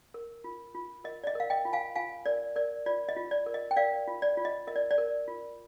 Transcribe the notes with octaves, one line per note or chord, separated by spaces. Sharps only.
A#4
F4
F4
A#4 D#5
D5
D#5
A#4 F5
D#5 G5
F4
F5 G#5
F4 F5 G#5
A#4 D5
A#4 D5
F4 D5
D#5
F4
D5
A#4
D#5
G5
A#4 D5 F5
F4
D5
F4
D#5
A#4 D#5
D5
D5
A#4
F4